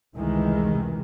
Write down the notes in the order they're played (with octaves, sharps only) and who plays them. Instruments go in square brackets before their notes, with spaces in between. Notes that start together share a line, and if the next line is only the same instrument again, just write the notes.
[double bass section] F1 C#2 D#3 E3 G#3